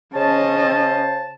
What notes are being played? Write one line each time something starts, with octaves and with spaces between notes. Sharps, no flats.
C#3 C#4 C5 D#5 A5